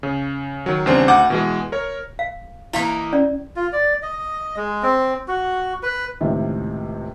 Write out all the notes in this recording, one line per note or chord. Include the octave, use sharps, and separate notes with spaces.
C#3
D#3 F#3
E2 C#3 G3 C4 D4 C5
D2 F#5 D6 G6
B2 E3 G#3
A#4 C#5
F5
E3 A#3 D#4 E4 F5
C#4 D5
F4
D5
D#5
G#3
C4
F#4
B4
C#2 A2 C3 D#3 E5